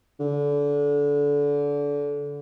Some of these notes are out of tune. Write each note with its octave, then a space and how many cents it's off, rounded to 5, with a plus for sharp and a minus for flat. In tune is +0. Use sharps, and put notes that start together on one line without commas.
D3 -25